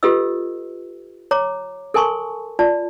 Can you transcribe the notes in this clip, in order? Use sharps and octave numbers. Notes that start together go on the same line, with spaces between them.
F4 G4 A4 B4 D#5 E6
C#5 A#5 D6
A4 A#4 G#5 A5 C6 C#6
F4 D5 A5